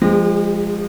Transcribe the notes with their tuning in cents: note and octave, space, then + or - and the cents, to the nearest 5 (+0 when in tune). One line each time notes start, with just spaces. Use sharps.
F3 +0 G#3 -20 G4 +40